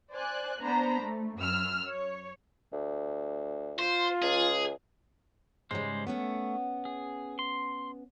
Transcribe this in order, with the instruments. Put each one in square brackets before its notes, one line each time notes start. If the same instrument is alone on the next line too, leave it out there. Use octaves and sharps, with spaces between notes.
[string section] C5 D5 G#5 F#6
B3 D4 C5 A#5 B5
A3
F#2 E6 F6
C#5
[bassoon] D2
[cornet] F4 [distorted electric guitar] C5
[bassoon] C#2 [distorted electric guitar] G#4
[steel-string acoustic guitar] G#2 C#3 G3 [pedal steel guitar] G#3 C5
[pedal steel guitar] A3 [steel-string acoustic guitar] B3 C#4 F#5
[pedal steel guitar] G#4
C6